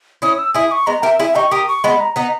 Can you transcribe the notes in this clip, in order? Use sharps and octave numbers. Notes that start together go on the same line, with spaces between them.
C#4 E4 D#6
E6
E4 G#4 D#6
C#6
G#3 B3 A#5
G4 A#4 E5
E4 G#4 E5
D#4 G4 C#6
G4 A#4 D#6
C#6
G#3 B3 B5
A#5
B3 D#4 A#5